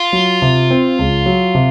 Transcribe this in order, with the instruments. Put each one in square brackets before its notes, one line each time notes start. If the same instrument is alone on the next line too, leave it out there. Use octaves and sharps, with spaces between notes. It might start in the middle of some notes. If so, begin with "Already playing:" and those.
Already playing: [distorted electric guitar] F4
[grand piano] F#3
C3
C4
C#2
F#3
C3